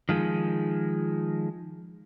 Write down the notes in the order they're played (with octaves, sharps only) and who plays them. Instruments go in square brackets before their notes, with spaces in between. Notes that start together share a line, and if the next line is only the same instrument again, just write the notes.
[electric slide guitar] D#3 F3 G#3